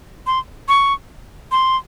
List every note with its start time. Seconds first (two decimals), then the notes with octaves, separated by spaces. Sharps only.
0.27 C6
0.68 C#6
1.52 C6